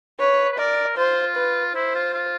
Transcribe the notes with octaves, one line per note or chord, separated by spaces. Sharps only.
B4 C#5
B4
A#4 D5
F4 C5
B4
E4 C5
F4
F4